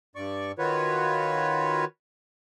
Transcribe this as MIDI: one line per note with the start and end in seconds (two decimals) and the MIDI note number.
0.16 0.52 43
0.16 0.52 74
0.16 0.52 85
0.59 1.85 51
0.59 1.85 65
0.59 1.85 66
0.59 1.85 71
0.59 1.85 73